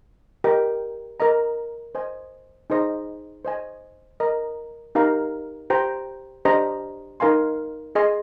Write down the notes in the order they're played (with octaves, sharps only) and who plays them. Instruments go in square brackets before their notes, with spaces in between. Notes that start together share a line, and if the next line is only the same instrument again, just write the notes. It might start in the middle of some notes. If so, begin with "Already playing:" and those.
[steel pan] G4 A#4 D#5 G5
A#4 D#5 A#5
C5 D#5 G#5
D#4 G#4 C5 D#5 A#5
C5 D#5 G#5
A#4 D#5 A#5
D#4 G4 A#4 F5 A#5
G4 C5 G5 A#5
D4 G4 C5 D#5 A#5
D#4 A#4 F5 G#5 C6
G#4 D#5 G#5 C6